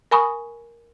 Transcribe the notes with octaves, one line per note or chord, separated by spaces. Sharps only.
A#4 G#5 B5 C#6 D#6